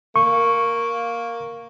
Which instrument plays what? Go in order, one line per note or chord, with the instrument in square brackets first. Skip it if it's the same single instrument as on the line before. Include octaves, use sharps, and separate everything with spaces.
[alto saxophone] A#3 [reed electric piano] C#6